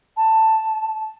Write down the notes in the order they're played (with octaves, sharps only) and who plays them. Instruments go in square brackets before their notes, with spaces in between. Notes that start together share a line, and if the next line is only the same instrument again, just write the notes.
[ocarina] A5